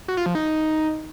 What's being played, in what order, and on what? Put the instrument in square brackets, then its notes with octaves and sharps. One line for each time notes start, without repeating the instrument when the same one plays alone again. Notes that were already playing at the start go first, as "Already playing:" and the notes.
[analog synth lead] F#4
F4
F3
D#4